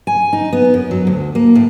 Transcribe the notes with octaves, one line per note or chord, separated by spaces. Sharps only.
G#5
D#4
B3
F#2
F#3
D2
A#3
A2